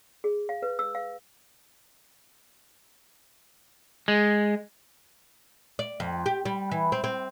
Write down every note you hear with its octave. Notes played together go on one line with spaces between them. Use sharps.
G#4
F5
B4
E6
F5
G#3
D5
F2
G4
G3
E3
C4
C4